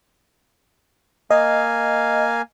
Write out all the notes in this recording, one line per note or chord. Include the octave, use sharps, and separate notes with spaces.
A#3 D#5 F5 G#5